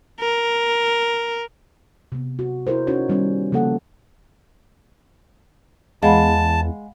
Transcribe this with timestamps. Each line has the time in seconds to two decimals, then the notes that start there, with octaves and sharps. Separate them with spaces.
0.19 A#4
2.12 C3 B3
2.39 F#4
2.67 E4 G#4 A#4 C5
2.87 C#4 D#4 F#4 C#5
3.09 D#3 G3 B3 C#4
3.52 C#3 F3 A#3 A4 F#5
6.03 E2 G#3 F5 F#5 A5 B5